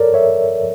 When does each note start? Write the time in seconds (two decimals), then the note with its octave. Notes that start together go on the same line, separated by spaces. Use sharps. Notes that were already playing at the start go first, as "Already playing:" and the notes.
Already playing: A4 A#4 C#5 D5
0.14 C#5 E5